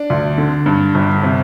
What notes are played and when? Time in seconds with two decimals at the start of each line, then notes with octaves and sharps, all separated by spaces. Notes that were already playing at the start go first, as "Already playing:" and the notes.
Already playing: D4
0.10 D2
0.38 D3
0.66 G2
0.95 G1
1.23 C3